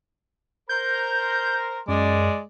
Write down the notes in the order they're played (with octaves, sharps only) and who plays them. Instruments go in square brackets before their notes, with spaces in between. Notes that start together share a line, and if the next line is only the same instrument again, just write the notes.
[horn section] A#4 C5 A#5 [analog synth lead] G6
[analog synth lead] F#2 [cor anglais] G#3 [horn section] D5